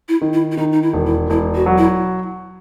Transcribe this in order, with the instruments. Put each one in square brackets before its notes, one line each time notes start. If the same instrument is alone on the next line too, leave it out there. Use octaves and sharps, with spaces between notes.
[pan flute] E4
[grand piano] D#3
[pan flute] E4
E4
[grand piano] D#3 [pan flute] D#4
[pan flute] D#4
E4
[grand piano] E1
[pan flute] E4
[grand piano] E1 [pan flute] E4
[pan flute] F#4
[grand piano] F#3
[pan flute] E4